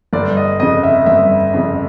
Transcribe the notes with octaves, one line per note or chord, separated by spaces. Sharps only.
G1 D5
D#5
F2 C#3 D#5
E5
G1 E5
F2 C#3